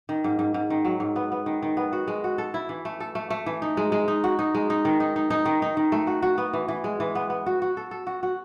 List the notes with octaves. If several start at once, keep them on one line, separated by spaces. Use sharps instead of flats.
D#3
G#2
G#2
G#2
D#3
F#3
G#2
B3
B3
D#3
D#3
B3
F#4
G#3
F#4
A4
E4
E3
A3
A4
A3
A3
E3
D#4
G#3
G#3
D#4
F#4
D#4
G#3
D#4
D#3
D#4
D#4
D#4
D#3
D#4
D#3
A3
F#4
F#4
B3
E3
E3
G#3
E3
B3
B3
F#4
F#4
A4
A4
F#4
F#4